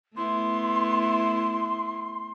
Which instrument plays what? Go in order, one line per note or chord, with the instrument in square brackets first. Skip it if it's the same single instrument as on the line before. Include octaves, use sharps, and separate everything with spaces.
[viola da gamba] A3 B3 E4 [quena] C6